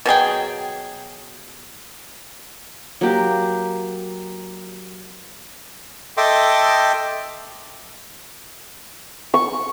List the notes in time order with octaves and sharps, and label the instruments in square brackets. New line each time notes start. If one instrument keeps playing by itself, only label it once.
[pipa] B2 F#3 G#4 G5
[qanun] F#3 A#3 G4
[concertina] A4 D#5 E5 G5 C6 D6
[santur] C#6